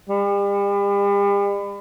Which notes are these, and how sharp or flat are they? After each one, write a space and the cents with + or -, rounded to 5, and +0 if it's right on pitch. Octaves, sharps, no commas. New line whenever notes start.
G3 +40